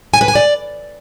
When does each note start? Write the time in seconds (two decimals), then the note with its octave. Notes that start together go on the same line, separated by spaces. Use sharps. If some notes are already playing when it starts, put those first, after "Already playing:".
0.14 G#5
0.21 B4
0.28 G#5
0.35 D5